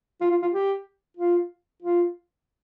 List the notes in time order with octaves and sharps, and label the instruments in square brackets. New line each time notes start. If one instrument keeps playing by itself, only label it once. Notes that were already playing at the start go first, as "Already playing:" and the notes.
[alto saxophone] F4
F4
F4
G4
F4
F4